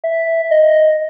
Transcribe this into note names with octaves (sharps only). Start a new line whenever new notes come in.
E5
D#5